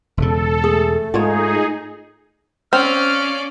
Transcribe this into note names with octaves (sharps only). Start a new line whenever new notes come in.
E1 C#3 A4
A3 G#4
G#2 D#4 F4 G#4 C#5
C4 C#4 D5 F5 F6